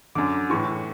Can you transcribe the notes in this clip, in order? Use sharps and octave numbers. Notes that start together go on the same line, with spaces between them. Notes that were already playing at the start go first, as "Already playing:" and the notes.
F#2 D3 D6
A2 E3 C#6